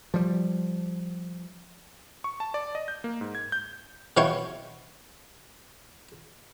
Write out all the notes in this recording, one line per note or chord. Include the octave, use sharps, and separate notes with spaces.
F3 G3
C#6
A5
D5
D#5
G6
A#3
G#2
G#6
G6
B2 E3 C#5 F5 G5 C#6